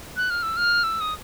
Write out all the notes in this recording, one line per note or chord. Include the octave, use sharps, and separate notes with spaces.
F#6
F6
E6
F6
E6
D#6